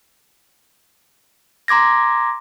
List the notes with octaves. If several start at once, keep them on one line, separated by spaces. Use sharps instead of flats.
A#5 C6 D6 G#6 A#6